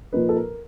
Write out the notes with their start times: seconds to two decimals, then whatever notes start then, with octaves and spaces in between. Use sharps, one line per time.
0.13 A#2 F3 A#3 D#4 B4
0.29 A4
0.36 A#4